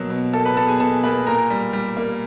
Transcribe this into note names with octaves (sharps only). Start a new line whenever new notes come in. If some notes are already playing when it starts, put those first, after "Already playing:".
Already playing: B2 F#3 A#3
B2
A#3 A4 A5
B4 B5
B2 A4 A5
G#4 G#5
B2 A4 A5
A#3 B4 B5
A#2 A#4 A#5
G3
G3
A#3